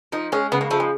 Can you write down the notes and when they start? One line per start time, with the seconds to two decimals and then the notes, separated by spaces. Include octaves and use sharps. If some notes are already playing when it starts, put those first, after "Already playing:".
0.12 F3 D#4
0.32 G#3 C#4
0.52 C#3 B3
0.61 A#3
0.71 F3 A3
0.80 G#3